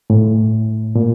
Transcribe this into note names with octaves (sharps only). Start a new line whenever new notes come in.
A2
A#2